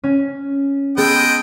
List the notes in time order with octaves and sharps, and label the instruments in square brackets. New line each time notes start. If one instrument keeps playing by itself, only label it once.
[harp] C#4
[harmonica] G#3 D#5 G5 [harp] B3 G#4 A4